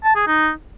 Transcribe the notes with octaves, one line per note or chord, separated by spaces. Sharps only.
A5
G#4
D#4